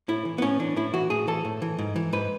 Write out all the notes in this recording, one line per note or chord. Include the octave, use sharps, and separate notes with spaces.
A2 E4
E3
B3
A2 C#4
E3 D4
A2 E4
E3 F#4
A2 G#4
E3 A4
A2
E3
G#2
E3
G#2 B4